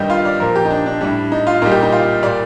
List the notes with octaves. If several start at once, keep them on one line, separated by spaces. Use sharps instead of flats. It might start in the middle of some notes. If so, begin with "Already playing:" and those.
Already playing: G2 D#3 G3 D#4 G4
F4
D5
A#2 F3 A#4
G4
D#4
D4
D4
A2 G3 D4
D#4
F4
A#2 G3 D#4
G4
D#4
F4
A#2 G3 D5